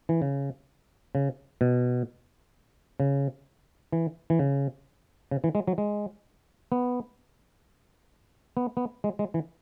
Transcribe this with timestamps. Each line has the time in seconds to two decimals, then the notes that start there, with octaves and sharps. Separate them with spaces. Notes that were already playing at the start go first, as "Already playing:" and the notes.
0.09 E3
0.22 C#3
1.15 C#3
1.61 B2
3.00 C#3
3.92 E3
4.30 E3
4.39 C#3
5.31 C#3
5.44 E3
5.55 G#3
5.67 F#3
5.78 G#3
6.72 B3
8.57 B3
8.77 B3
9.04 G#3
9.19 G#3
9.34 E3